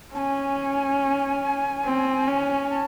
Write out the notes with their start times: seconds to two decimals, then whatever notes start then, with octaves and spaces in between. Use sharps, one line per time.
0.15 C#4 G#5 A5
1.85 C4
2.28 C#4
2.70 A5